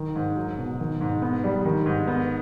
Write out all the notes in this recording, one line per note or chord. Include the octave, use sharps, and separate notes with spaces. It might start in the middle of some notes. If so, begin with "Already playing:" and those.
Already playing: D#3
G#2
F#3
B2
D#3
G#2
B3
G3
D#3
G#2
B3